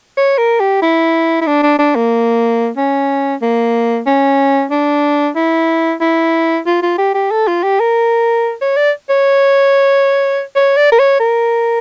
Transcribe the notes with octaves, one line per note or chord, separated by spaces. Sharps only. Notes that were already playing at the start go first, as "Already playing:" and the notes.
C#5
A#4
G4
E4
E4
D4
D4
D4
A#3
C#4
A#3
C#4
D4
E4
E4
F4
F4
G4
G4
A4
F4
G4
A#4
C#5
D5
C#5
C#5
D5
A#4
C#5
A#4